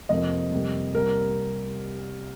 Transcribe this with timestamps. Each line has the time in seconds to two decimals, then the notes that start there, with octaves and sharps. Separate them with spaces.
0.09 F2 C3 F3 A#3 D#5
0.52 F2 C3 G3 A#3
0.94 C2 C3 G3 A#3 A#4